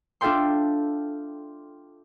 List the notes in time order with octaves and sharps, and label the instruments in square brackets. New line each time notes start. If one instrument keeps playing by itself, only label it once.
[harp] D4 F4 A4 E5 G5 C6